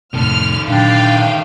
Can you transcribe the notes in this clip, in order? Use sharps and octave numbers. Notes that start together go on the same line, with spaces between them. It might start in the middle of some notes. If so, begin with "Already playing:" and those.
F2 A2 C3 D#3 A4 F6
A#2 D3 F#3 D4 F5 G5